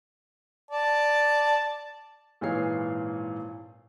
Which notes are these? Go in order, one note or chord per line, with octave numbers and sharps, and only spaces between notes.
D5 A5
G#1 A#2 E3 G#4 C#5 C7